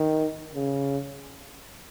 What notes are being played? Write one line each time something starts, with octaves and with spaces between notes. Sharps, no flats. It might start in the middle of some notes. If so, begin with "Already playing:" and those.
Already playing: D#3
C#3